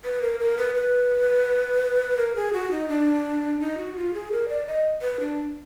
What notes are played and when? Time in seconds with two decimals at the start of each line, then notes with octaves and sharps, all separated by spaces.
0.04 B4
0.22 A#4
0.40 A#4
0.58 B4
0.75 B4
2.17 A#4
2.36 G#4
2.53 F#4
2.71 D#4
2.89 D4
3.60 D#4
3.78 F#4
3.96 F4
4.14 G#4
4.32 A#4
4.49 D5
4.67 D#5
5.02 B4
5.20 D4